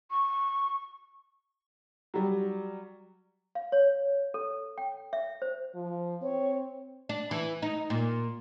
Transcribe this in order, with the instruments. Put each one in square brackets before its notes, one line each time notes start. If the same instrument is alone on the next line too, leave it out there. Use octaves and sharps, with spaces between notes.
[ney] C#6
[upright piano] F#3 G3
[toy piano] F5
C#5
A4
G5
E5
C5
[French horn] F3
[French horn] C4 [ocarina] C#5
[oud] D4
E3
D#4
A#2